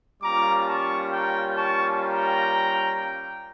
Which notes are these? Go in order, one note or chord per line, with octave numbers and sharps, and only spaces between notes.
G3 A#3 C#4 F4 A#5 D6
A5 C#6
G5 A#5
A5 C#6
G5 A#5